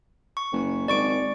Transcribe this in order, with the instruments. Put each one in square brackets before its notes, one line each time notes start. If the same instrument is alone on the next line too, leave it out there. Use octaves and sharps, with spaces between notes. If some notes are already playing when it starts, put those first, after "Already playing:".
[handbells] C#6
[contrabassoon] F#1
[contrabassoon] G#1 [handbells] D5 C#6 D7